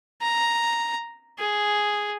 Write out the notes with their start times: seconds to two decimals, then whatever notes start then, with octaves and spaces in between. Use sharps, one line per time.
0.22 A#5
1.39 G#4